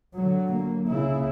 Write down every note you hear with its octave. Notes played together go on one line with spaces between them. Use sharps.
D3 F#3
A#3
C#3 E4